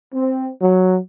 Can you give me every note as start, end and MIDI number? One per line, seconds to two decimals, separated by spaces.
0.13 0.49 60
0.62 0.98 54